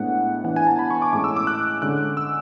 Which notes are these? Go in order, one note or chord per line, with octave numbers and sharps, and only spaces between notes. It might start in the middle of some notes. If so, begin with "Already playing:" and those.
Already playing: A2 G#3 B3 D4 F#5
E3 B3 D4 F#5
G#5
A5
B5
C#6
D6
A2 G#3 C#4 D6
E6
D6
F#6
D3 G#3 C#4 F#6
E6